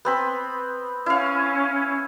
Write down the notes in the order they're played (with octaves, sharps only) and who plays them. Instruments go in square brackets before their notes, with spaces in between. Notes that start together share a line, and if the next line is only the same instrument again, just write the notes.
[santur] B3 C4 B5
[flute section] C#4 [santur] E4 F5